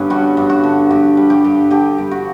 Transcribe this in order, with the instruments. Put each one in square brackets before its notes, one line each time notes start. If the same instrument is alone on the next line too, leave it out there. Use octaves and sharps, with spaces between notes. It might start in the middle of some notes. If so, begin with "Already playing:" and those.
Already playing: [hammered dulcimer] G2 D3 B3 C#4
G3 F#4
G2
F#4
D3
G2 G4
G3
G4
G2
D3 G4
G2
F#4